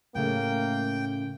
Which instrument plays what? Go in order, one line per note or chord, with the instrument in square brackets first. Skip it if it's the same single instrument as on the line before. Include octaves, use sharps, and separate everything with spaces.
[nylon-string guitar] A2 C#3 A3 [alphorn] A#3 [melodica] G5